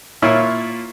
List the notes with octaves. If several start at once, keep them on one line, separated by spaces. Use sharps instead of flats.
A#2 E4 F4 C#5